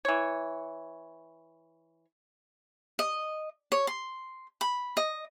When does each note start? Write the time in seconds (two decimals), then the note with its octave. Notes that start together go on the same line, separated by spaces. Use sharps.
0.05 E3 C#5
2.99 D#5
3.72 C#5
3.87 C6
4.61 B5
4.97 D#5